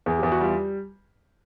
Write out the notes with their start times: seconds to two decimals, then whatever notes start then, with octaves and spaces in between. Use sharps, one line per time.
0.06 E2 G#4
0.18 E2 G4
0.32 F#4
0.40 G3 F4